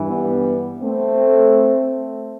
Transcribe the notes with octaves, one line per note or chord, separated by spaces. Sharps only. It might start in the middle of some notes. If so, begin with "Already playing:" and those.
Already playing: G2 E3
G3 B3
A3 C4